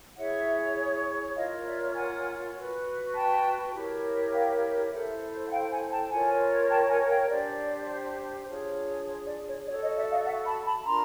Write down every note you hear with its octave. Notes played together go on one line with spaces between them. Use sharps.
E4 G#4 C#5 E5 F#5
F4 A#4 C#5 D#5 F5
D5 E5
F#5 G#5
F#4 B4
G5 A5
E4 G4 A#4 C#5
F5 G5
E4 A4 C5 E5 F#5
F#5
F5 G5
F#5 G#5
G5 A5
F4 A#4 C#5 F#5 G#5
G5 A5
F#5 G#5
F5 G5
D4 G4 C5 D5
D4 F4 G#4 C#5
C#5
D5
C#5
F#4 A4 C#5 D5
C#5 D#5
D5 E5
D#5 F5
E5 F#5
A5 B5
A5 B5
D4 F4 A#4 A#5 C6